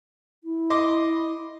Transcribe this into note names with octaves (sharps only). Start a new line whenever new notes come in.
E4
D#5 C6 D6